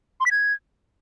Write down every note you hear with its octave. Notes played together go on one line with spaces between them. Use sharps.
C6
B6
G#6